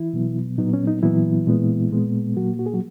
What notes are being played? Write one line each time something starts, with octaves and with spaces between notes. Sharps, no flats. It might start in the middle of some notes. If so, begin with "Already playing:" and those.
Already playing: E3 E4
B2 F#3 B3
A#2 F#3 B3 D#4
C#4
D#4
A#2 E3 F#3 B3 E4
A#2 G#3 B3
A#2 G#3 B3
A#2 F#3 A#3 F#4
F#4
G#4
F#3 F#4